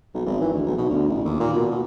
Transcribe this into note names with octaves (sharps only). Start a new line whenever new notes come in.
B1
G#1
E3
D2
B1
B2
D2
A1
D#2
A#2
B2
B2